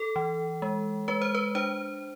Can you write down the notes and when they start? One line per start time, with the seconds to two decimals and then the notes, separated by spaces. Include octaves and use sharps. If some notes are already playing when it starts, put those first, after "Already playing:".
Already playing: A4
0.16 E3
0.62 G#3
1.08 G#3 B4
1.22 C5
1.35 B4
1.55 D4 C5